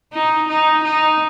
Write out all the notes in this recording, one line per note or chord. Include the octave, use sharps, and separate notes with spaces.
D#4
D#4
D#4